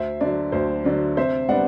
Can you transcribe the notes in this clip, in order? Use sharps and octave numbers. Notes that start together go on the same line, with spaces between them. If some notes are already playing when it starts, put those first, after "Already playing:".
Already playing: D2 C5 E5
D3 F#3 D5
D2 C5
D3 F#3 D5
C3 C5 E5
G3 B3 D4 D5 F#5